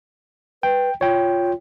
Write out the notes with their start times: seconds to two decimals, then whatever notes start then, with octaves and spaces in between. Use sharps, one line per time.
0.63 B4 G5
1.01 F4 C#5 G5